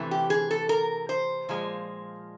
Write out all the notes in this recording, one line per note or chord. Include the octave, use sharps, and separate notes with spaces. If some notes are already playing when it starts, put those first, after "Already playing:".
Already playing: C3 E3 A3
G4
G#4
A4
A#4
C5
A#2 F3 G#3